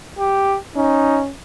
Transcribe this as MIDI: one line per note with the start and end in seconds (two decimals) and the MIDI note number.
0.19 0.58 67
0.76 1.32 61
0.76 1.20 63